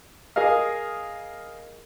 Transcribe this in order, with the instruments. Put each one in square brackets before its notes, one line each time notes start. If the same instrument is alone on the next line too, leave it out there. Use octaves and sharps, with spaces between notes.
[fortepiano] G#4 A#4 D#5 F5